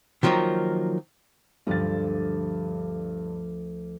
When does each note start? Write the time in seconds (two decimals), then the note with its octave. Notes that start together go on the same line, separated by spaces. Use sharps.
0.23 D#3 F3 F#3 A#3 D#4
1.67 D2 G2 F3 A6